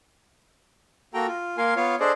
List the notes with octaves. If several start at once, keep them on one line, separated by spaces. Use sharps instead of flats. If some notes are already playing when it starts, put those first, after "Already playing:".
A#3 F#4 A4 G5 A#5
F4
A#3 A#4 F5 G#5 C6
B3 F4 C#5 F5
D4 G#4 A4 C5 D5 D#5